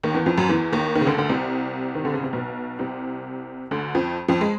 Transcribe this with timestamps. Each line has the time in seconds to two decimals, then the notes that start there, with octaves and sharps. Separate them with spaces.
0.04 D#2 D#3
0.14 E2 E3
0.26 F2 F3
0.38 F#2 F#3
0.49 E2 E3
0.72 D#2 D#3
0.95 D#2 D#3
1.01 C#3
1.07 D2 D3
1.18 D2 D3
1.29 C2 C3
1.95 D#3
2.05 D3
2.14 C#3
2.24 C3
2.33 B1 B2
2.79 C2 C3
3.71 D2 D3
3.95 F2 F3
4.28 F2 F3
4.41 G#3